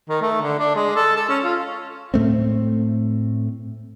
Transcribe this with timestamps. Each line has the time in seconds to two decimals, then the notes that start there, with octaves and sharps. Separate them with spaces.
0.09 D#3
0.22 A3
0.42 D3
0.59 D4
0.76 G#3
0.96 A4
1.16 A4
1.29 C#4
1.44 F4
2.14 A2 A3 C4